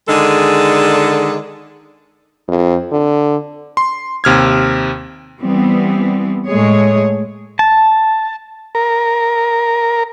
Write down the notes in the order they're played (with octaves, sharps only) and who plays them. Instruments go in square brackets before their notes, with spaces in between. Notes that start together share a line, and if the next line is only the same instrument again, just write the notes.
[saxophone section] D3 D#3 G#3 G#4 A4 D5
[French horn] F2
D3
[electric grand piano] C6
D#2 C3 F6 G#6
[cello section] E3 G3 B3 C4
A2 G#3 A3 G#4 C#5
[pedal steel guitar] A5
[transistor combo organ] A#4